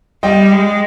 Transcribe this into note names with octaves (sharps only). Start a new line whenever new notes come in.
G3 D#5 G5
G#3